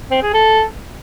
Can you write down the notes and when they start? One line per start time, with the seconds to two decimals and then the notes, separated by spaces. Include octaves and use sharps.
0.11 C4
0.22 G#4
0.34 A4